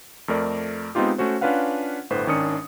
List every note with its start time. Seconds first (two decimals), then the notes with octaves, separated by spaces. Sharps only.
0.28 F2 A3 A#4 D5
0.95 G#3 B3 C4 D#4 F4 G4
1.18 A3 C#4 F#4 C5
1.41 C#4 D4 F4 B4 F5 F#5
2.10 G1 A2 D3 B4 C5
2.27 G#1 D#3 C#4 D4 D#6 C#7